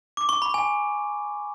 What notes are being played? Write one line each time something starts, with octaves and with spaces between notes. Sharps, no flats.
D6
C#6
B5
G#5